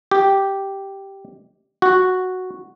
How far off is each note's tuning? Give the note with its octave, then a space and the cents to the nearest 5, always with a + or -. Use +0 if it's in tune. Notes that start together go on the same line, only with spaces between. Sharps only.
G4 -5
F#4 -5